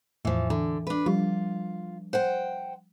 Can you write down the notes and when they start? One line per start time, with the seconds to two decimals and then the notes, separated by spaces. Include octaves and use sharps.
0.25 E2 A2 E3 F3
0.50 D3 E3
0.87 D4 B4
1.06 F3 G3 F4
2.13 C5 F#5 G5